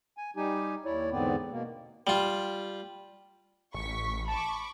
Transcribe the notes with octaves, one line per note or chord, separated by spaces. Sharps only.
G#5
G3 D#4 G4 G#5
D#2 E4 C#5 D5
E2 G#2 D3 B3 C4 D5
B2 A#3
G3 F4
A1 C#6 B6
A5 B5 C#6 D6